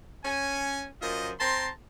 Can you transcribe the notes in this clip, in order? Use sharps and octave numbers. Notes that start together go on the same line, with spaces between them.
C#4 G#5
F#2 F4 A#4 C5 D#5
C4 A5 A#5 C6